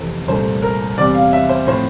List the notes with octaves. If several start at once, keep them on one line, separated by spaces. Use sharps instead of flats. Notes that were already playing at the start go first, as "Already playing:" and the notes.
Already playing: F2 C3 E3 A3 C5
C2 A#2 A3 C5
A#4
E2 C3 G3 C4 D5
F5
E5
C5
A2 F3 C4 C5